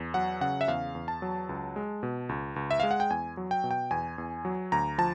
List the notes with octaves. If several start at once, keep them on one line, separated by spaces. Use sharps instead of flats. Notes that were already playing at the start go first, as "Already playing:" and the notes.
Already playing: E2
F#3 F#5
C#3 F#5
E5
E2 F5
E2
A5
F#3
C#2
G#3
B2
C#2
C#2
E5
G#3 F5
F#5
G5
E2 G#5
F#3
G5
B2
G5
E2 G#5
E2
F#3
D2 A#5
F3 A5